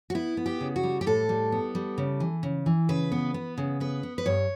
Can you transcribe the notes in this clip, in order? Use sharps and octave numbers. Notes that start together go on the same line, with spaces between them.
F#4
B3 E4
B3
G4
C#3
F#4
G3
G4
A2 A4
G3
B3
G3
C#3
E3
C#3
E3
C#3 B4
B3
B3
C#3
B3 B4
B3
B4
G2 C#5